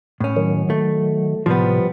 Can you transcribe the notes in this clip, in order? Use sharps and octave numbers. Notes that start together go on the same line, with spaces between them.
A2 C#4
D#3 F#3
A3
A2 C3 F3 G3 B3